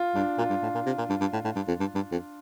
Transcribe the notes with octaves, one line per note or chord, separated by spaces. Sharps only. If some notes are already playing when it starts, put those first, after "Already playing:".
Already playing: F4
G2 D4
A#2 F4
G2
A2
A#2
C3
A#2
G2
G2
A2
A2
G2
F2
G2
G2
F2